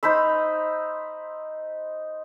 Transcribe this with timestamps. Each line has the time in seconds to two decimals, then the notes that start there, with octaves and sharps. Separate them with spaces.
0.03 D#4 C5 B5 E6